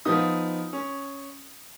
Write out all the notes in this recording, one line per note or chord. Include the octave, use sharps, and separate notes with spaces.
F3 B3 D#4 D#6
C#4